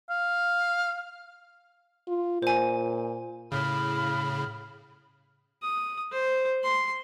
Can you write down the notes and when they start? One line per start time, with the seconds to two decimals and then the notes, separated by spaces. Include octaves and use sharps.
0.10 F5
2.08 F4
2.42 A#2 C5 G#5
3.52 A2 C#3 B5 F6
5.62 D#6
6.12 C5
6.64 C6